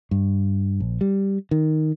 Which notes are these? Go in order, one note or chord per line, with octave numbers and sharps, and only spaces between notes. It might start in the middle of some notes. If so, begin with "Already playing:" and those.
G2
A#1
G3
D#3